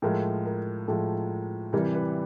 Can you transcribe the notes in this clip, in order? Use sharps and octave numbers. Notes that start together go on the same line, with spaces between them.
A2 F3 G#3 A#4
A#4
A2 F3 G#3 A4
C3 E3 G3 A#4
B4